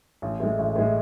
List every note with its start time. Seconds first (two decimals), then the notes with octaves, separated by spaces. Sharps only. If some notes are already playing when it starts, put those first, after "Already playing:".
0.22 A1
0.40 A2 G#3
0.59 A1
0.76 A2 G#3